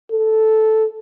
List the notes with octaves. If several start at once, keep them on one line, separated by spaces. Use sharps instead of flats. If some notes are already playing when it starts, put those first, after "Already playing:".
A4